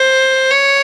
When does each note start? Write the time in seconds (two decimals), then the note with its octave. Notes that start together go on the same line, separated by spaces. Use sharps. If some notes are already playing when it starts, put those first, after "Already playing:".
Already playing: C5
0.51 C#5